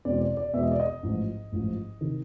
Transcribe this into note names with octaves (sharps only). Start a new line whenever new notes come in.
E2 B2 G#3 C4 D5
D5
D5
E2 B2 G#3 C4 E5
D#5
D5
D#5
A1 G#2 F3
A1 G#2 F3
C3 D#3